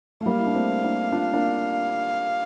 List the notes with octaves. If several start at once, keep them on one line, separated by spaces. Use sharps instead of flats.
A3
G3 A#3 F5
E4
D4
A3 C4
A#3 D4
D4 F4
A#3 D4